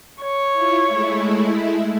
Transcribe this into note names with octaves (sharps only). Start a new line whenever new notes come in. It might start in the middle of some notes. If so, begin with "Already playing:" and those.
C#5
E4 F4
G#3 A3 E4